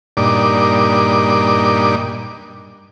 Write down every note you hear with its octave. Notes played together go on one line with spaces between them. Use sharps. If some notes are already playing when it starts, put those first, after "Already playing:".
G2 A#2 D4 D#4 D6